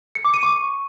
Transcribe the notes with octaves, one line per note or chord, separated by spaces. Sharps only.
C#7
D6
D#7
C#6